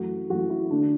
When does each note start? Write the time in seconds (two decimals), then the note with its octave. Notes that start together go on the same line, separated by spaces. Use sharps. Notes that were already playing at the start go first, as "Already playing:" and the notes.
Already playing: F#2 E3 A3 F#4
0.30 F#2 E3 A3 F#4
0.50 E4
0.70 D3 A3 D4